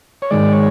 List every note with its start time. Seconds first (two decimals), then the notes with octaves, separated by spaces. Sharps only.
0.22 C#5
0.31 G#2 D#3 G#3 D5
0.53 C#5